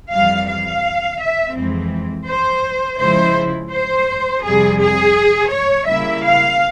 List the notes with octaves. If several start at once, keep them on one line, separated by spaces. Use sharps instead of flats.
F2 E3 G3 F5
F5
E5
F2 E3 G#3 C4
C5
C#3 F3 G#3 E4 C5
C5
F2 C3 G3 G#4
G#4
C#5
C#3 G3 A#3 E4 E5
F5